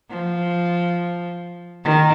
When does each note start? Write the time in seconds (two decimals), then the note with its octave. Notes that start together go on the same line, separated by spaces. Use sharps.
0.10 F3
1.84 D#3